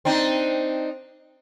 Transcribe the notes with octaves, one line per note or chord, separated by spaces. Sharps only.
C4 D4 D#4